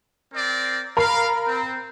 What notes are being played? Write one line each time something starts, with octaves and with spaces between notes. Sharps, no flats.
C4 A#4 D5
A#4 F5 B5
C4